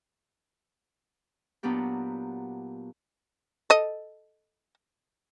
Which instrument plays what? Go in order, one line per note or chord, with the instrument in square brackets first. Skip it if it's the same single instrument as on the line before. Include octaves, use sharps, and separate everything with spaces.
[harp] A#2 F#3 B3 D4 G4
[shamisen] A4 D#5